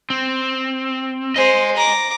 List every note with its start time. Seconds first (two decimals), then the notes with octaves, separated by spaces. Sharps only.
0.10 C4
1.36 C5 D#5 G#5
1.77 A#5 D6